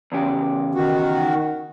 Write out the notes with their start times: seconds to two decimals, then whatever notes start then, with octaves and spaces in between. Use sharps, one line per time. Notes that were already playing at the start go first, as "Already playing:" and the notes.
0.12 E2 C#3 G4
0.75 D#3 F#4